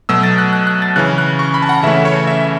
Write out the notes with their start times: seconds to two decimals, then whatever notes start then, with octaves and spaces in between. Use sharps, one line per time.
0.09 B2 F#3 A3 E6
0.23 A6
0.38 F#6
0.53 F#6
0.67 F#6
0.82 A6
0.96 C#3 E3 C#4 F#6
1.18 F#6
1.39 C#6
1.54 B5
1.62 A5
1.69 F#5
1.83 C#3 E3 A3 C#4 E5
2.05 C#5
2.27 E5